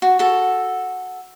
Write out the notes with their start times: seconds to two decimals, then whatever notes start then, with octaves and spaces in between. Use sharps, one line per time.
0.02 F#4
0.19 F#4 A4